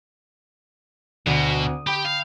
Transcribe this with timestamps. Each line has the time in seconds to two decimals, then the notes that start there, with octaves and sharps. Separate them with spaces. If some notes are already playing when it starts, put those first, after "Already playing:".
1.26 D2 B2
1.63 D#6
1.87 G4 G5 B5
2.05 F5